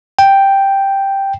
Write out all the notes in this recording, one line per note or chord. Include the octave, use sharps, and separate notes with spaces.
G5